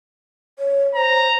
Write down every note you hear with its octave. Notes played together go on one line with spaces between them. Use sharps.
C#5
C5 A#5